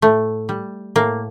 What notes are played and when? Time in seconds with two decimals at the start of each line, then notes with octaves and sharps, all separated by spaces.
0.02 A2 A3
0.49 G3
0.96 A2 A#3